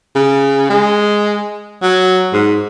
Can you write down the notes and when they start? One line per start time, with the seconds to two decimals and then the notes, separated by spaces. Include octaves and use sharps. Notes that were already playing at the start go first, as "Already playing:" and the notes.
0.16 C#3
0.70 G#3
1.82 F#3
2.33 G#2